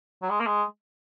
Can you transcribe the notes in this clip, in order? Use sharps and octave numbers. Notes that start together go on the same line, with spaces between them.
F#3
G#3
A#3
G#3